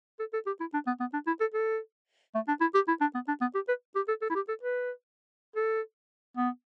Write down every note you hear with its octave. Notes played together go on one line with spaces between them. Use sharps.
A4
A4
G4
E4
D4
B3
B3
D4
E4
A4
A4
A3
D4
E4
G4
E4
D4
B3
D4
B3
G4
B4
G4
A4
A4
E4
G4
A4
B4
A4
B3